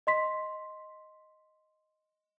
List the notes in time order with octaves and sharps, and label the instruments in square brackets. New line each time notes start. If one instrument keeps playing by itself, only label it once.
[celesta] D#5 C6 B6